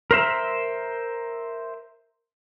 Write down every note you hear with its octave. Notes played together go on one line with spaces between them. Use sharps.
A#4 C5 E5